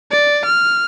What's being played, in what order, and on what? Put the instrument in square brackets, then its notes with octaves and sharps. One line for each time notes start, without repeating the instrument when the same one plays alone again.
[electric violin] D5
F6